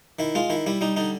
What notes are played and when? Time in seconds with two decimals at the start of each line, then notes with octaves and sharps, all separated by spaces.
0.19 D#3 E4
0.35 G#3 F4
0.50 D#3 E4
0.67 G3 E4
0.81 G3 D#4
0.96 D3 D#4